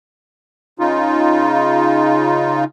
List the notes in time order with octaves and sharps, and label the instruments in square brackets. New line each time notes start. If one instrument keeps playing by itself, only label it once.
[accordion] C#3 D#4 F4